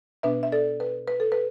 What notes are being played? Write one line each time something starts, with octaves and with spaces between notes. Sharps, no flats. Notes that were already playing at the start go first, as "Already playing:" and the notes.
B2 B3 D4 B4 E5
E5
A4 D5
B4
B4
A4
B4